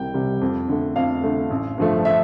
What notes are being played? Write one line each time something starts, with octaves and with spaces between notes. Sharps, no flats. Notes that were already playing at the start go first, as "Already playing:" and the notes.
Already playing: C2 C3 G3 G5
C3 G3
F2
D3 A3
F2 F5
D3 A3
A1
G2 F3 A3
E5